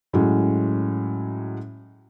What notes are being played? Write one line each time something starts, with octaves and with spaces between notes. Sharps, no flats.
A2 F#3 G#3 C#4